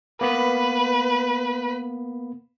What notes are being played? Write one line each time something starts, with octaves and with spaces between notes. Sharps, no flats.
A#3 B3 B4 B5